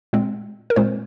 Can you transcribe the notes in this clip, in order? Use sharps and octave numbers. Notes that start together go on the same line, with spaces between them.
A#2 G#3 C4
A#4
A#2 G#3 C4 C5